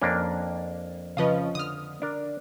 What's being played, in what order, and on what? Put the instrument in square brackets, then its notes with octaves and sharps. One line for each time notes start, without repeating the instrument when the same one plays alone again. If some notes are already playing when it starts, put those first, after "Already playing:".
[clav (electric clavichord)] F2 A#3 D4 [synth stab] C#4
[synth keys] C#3 F3 C#4 [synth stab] B4 D#5 F5
[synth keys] D3 [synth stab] D#6 F6
[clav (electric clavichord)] D4 A#4